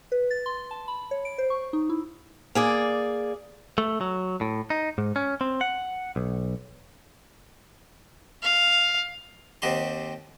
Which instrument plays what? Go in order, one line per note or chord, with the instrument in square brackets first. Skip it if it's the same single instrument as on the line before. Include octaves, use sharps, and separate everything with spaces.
[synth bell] B4
A6
C6
A5
B5
C#5
D7
C5
C#6
D#4
E4
[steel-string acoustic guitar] A#3 G#4 D5
[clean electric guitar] A3
F#3
A2
D#4
G#2
C#4
C4
F#5
B1
[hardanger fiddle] F5
[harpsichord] D#2 C4 D#4 F#4 G4 C6